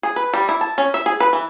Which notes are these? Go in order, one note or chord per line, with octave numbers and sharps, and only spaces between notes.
G#4
B4
G3
E4
A5
C#4
E5
G#4
B4
E3